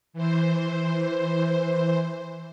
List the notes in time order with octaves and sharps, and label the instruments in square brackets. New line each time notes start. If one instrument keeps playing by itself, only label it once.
[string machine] E3 C5